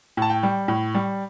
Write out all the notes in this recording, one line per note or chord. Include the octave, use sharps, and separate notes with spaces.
A2 A5
G5
G3
A2
G3